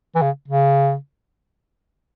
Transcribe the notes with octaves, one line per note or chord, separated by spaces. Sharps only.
E3
C#3
C#3